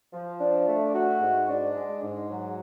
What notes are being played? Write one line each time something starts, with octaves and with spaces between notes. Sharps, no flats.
F3
D4
A3
F#4
G#2
D4
G#3
G#2
F#3